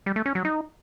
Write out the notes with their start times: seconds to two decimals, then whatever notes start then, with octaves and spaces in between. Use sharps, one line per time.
0.06 G3
0.16 A3
0.26 C#4
0.35 F#3
0.45 D#4